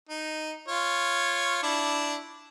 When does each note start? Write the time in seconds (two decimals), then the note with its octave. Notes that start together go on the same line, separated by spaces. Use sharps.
0.09 D#4
0.68 F4 C#5
1.63 D4 E4